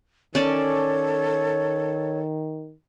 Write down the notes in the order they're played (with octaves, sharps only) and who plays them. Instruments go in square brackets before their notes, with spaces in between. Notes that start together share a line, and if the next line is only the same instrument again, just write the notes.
[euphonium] D#3 [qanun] C#4 D5 A5 [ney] A4 [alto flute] C#5